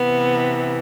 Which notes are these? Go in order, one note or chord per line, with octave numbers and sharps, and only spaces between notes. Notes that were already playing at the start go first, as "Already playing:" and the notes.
Already playing: C3 E3 B3